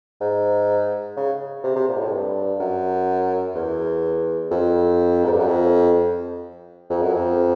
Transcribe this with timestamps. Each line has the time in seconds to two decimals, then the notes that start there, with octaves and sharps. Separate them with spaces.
0.21 G#2
1.17 C#3
1.64 C3
1.76 C3
1.88 A#2
1.95 G#2
2.00 A2
2.12 G2
2.60 F#2
3.55 E2
4.51 F2
5.25 G#2
5.32 G2
5.39 F#2
5.47 F2
6.90 F2
7.02 F#2
7.13 F2